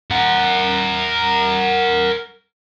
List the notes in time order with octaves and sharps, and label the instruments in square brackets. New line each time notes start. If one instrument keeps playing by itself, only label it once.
[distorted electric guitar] A#4 F#5